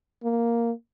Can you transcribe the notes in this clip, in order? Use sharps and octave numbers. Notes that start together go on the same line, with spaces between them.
A#3